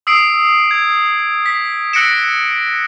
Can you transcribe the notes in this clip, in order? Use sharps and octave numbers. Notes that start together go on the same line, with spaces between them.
D#6 E6 C7 D7
G#6
B6
E6 F#6 A#6 C#7 D7 E7